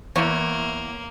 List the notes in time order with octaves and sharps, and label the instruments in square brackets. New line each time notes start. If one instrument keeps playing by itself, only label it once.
[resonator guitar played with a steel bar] E2 C#5 [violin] A#3